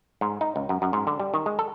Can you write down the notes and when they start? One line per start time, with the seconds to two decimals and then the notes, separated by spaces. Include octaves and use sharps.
0.21 G#2
0.41 D#4
0.56 C#2
0.69 F#2
0.82 F#2
0.93 G#2
1.07 D3
1.20 G3
1.34 D#3
1.46 G#3
1.59 A4